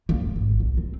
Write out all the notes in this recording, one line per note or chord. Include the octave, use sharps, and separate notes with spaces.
A#3
E1
G#1
C2
C4